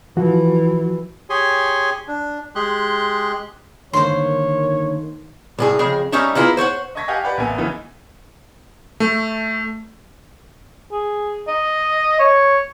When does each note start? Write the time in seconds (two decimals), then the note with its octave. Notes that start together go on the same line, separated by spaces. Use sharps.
0.17 E3 F3 F#4
1.30 G4 G#4 C#5 G#5 C6
2.08 D4
2.55 G#3 G4 G#4 C6 F#6
3.93 G2 D3 D#3 A#3 C5 C#5 C6
5.59 C2 A2 G#4
5.79 F2 C#3 G#4 G5
6.12 G3 C#4 D#4 G4 C#5 E5
6.35 A#3 B3 E4 F4 G#4
6.57 C5 C#5 E5 F#5
6.95 D#5 A5 C#6 G#6 A#6 B6
7.08 G4 D#5 F5 F#5 G#5
7.24 G4 B4 D5 F#5
7.38 A1 A#3 B3 G#5
7.57 C#3 E3 B3 D#4
9.00 A3
10.92 G#4
11.47 D#5
12.19 C#5